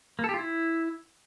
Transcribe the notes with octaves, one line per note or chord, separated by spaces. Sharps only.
A#3
A4
G4
F4
E4